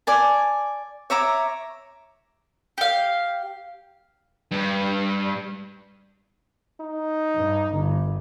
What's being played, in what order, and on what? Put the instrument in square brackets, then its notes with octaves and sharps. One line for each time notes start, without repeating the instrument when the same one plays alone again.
[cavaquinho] D5 G#5 A5
C#5 E5 A#5 D6
[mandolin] G4 F5
[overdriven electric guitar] G2
[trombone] D#4
[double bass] G2
G1